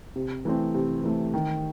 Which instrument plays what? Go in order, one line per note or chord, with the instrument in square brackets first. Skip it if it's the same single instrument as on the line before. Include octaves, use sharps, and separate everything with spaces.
[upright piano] C3
E3 A3 C4
C3
E3 A3 C4
D#3